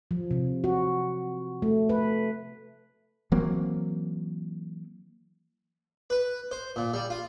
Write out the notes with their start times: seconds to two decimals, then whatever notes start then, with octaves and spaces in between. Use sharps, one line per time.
0.11 F3
0.31 C3
0.64 F#4
1.62 A3
1.89 B4
3.32 E3 F#3 A#3 C4
6.10 B4
6.51 C5
6.76 A#2
6.94 G3
7.10 F4